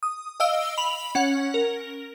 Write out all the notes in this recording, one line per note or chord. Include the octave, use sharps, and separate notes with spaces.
D#6
D#5 F5 E6 D7 G7
B5 F7 F#7
C#4 F#5
A#4